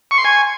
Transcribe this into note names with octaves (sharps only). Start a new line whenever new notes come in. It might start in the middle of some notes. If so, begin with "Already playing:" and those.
C#6
C6
G#5